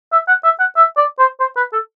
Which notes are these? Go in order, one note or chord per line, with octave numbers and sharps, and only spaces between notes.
E5
F#5
E5
F#5
E5
D5
C5
C5
B4
A4